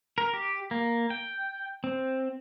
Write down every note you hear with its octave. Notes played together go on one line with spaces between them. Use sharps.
A#4
G4
A#3
G5
C4